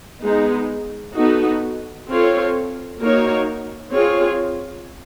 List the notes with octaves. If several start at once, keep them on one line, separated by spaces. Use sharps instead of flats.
G#3 B3 D#4
B3 D#4 F#4 A4
C4 F4 A4 C#5
A#3 D#4 F#4 A#4 C#5
C4 F4 G#4 C#5